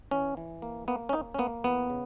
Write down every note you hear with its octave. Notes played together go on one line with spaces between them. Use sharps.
E3 C#4
E3
A#3
A#3 B3
C#4
A#3 D#4
C#4
A#3 B3
E2 B3
C#3